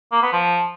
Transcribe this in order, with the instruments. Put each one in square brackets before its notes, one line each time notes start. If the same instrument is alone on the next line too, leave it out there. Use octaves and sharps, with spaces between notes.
[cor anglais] A#3
B3
F3